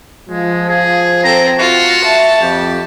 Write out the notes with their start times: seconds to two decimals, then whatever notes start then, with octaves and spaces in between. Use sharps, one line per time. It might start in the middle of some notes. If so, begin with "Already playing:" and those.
0.29 F3 G#3
0.69 G#4
1.24 C4 A4 A#5
1.59 F4 F#4
2.04 E5 A5
2.41 F2 G4